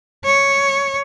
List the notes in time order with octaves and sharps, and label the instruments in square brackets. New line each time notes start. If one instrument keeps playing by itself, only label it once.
[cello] C#5